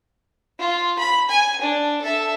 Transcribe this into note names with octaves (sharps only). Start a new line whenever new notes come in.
F4
B5
G#5
D4
A4 E5